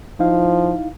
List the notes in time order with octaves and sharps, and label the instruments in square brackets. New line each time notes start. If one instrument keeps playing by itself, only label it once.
[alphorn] F3 [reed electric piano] D#4 E4 F5